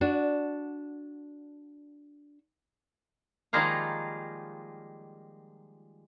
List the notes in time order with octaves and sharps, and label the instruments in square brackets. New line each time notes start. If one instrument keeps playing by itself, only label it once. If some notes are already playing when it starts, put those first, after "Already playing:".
[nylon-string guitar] D4 F#4
[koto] D#3 F3 G3 G#3 A#3 F4